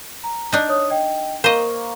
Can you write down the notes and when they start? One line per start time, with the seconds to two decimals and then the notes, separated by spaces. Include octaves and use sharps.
0.24 A#5
0.53 D4 D#4
0.69 C#5 D#6
0.90 D#5 G5
1.44 A#3 C5 D#5 F5 C#6